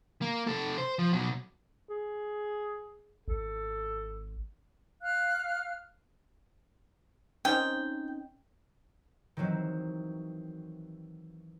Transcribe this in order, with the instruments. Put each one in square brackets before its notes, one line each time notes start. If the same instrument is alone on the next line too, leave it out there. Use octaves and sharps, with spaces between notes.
[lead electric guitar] A#3
C3 A4
C5
F3
B2 F#3
[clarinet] G#4
[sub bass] G#1 [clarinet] A4
[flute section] F5 F6 F#6
[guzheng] C4 C#4 D#4 [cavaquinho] G5
[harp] D#3 E3 F#3 C4